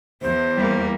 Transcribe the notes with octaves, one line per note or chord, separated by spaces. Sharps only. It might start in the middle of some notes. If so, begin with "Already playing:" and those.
E2 C5
G3 A#3